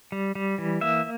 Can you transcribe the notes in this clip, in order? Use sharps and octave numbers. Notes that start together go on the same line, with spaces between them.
G3
G3
E3
A#3 E5